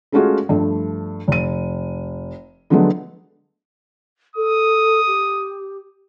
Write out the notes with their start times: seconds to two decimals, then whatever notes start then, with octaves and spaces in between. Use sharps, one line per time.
0.12 G#3 A3 C#4 F4 F#4 G#4
0.49 G2 F3 A3
1.28 F1 D#7
2.70 D3 F3 F#3 G#3 A3 B3
4.35 A4 D#6
5.06 G4